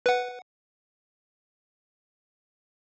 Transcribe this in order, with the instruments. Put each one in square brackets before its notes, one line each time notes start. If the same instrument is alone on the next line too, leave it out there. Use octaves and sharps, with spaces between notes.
[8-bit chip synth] B4 F#5